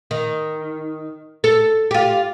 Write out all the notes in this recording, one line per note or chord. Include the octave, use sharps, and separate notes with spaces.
D#3
A4
F4 G4